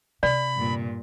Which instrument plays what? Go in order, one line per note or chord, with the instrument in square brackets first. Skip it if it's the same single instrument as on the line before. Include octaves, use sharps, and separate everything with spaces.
[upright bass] C3 [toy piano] D5 [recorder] B5
[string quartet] G2 A#2